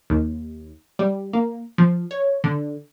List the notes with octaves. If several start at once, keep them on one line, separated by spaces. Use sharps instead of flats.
D#2
G3
A#3
F3
C#5
D3